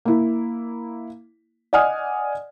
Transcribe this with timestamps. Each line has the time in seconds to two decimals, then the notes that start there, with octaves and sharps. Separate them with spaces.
0.05 A#3 E4
1.73 D5 D#5 F#5 G#5 D#6 F6